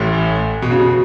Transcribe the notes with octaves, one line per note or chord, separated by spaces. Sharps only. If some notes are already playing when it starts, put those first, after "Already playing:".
Already playing: A1 A2
B2
C#3
B2